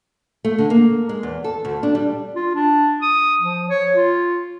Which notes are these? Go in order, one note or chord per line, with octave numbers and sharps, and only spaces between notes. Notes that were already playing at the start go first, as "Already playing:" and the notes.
A3
D3
A#3
G#3
E2
A4
D2
D4
G3
F4
D4
D#6
F3
C#5
F4